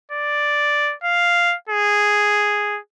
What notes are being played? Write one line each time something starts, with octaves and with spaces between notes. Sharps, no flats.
D5
F5
G#4